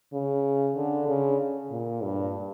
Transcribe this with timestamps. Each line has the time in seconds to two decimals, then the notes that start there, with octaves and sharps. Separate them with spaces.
0.13 C#3
0.76 D3
1.08 C#3
1.71 A#2
2.03 G2